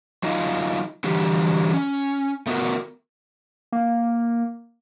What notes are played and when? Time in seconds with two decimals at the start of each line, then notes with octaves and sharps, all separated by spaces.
0.23 F#3 D#4 F4
1.04 D3 E3 F#3 G3 G4
1.74 C#4
2.47 A3 B3 F#4 A#4
3.72 A#3